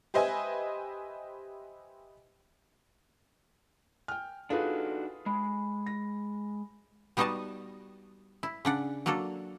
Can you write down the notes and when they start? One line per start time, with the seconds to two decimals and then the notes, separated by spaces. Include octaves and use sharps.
0.14 G4 B4 C5 D#5 E5 G#5
4.08 G5 G#5 F6
4.50 D4 D#4 F4 F#4 G#4 A4 B4
5.26 G#3 B5
5.86 A#6
7.17 G3 B3 D#4 F#4 D#5 A5
8.43 E4
8.65 C#3 D4 F#5
9.06 F#3 A#3 D4 F#4 A4